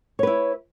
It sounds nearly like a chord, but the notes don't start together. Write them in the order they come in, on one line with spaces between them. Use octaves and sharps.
C#5 B4 E4